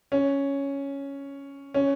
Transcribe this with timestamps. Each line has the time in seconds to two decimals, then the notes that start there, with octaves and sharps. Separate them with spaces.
0.12 C#4
1.74 C#4